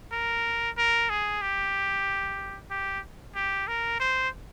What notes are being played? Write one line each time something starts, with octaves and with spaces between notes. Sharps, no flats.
A#4
A#4
G#4
G4
G4
G4
A#4
C5